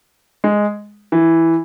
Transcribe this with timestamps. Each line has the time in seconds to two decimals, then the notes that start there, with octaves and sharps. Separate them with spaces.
0.44 G#3
1.12 E3